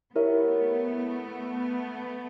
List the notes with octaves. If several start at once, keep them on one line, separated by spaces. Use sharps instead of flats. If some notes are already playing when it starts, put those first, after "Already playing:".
A3 B3 E4 G4 A#4 C#5 E5